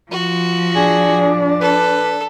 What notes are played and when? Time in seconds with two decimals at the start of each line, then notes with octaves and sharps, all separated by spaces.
0.12 F3 F#4
0.76 D4 G#4
1.61 A4 B4